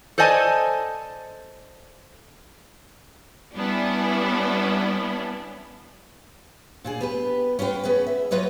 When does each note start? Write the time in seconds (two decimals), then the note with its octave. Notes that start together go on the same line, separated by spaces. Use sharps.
0.18 A4 C5 D5 D#5 G#5 A5
3.56 G3 B3 C#4 D4 E4
6.84 A#2 D4 G#4
7.01 B3 G4 B4
7.59 C#4 F4 A4 B4 G5
7.84 B3 C#4 G#4 B4
8.07 E5
8.31 F#3 F4 B4 C#5 D#5